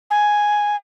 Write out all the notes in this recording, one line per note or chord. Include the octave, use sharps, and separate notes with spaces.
G#5